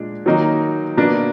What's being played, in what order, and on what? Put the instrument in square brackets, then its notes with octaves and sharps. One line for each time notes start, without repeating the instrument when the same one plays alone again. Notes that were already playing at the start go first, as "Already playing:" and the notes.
Already playing: [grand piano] A#2 G#3 D4
D#3 F#3 A#3 D#4
B2 A#3 D4